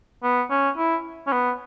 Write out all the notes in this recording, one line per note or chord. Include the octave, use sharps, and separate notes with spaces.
B3
C#4
E4
C#4
B3